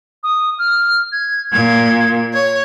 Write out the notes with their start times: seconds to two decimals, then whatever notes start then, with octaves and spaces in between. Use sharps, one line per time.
0.23 D#6
0.58 F6
1.12 G#6
1.52 A#2 G#6
2.33 C#5 G#6